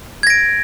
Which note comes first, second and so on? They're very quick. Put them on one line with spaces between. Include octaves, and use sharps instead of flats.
G#6 A#6 D7